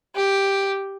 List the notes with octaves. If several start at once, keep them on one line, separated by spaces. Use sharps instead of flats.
G4